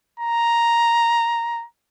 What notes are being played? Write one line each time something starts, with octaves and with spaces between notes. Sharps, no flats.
A#5